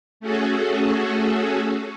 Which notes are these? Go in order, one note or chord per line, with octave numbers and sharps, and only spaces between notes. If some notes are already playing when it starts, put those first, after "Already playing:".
A3 C#4 F#4 G#4 A4